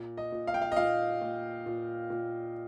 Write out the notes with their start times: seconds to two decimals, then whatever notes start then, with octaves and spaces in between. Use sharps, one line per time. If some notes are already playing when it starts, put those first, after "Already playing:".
Already playing: A#2
0.17 D#5
0.32 A#2
0.47 F5
0.54 G5
0.62 F5
0.72 D#5
0.76 A#2 F5
1.21 A#2
1.66 A#2
2.10 A#2